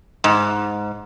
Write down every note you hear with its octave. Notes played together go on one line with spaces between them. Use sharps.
G#2